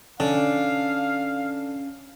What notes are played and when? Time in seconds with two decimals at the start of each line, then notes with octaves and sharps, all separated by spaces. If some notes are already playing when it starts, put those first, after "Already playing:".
0.20 D3 C#4 F5